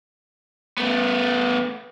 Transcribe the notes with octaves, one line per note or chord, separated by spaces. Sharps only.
A3 B3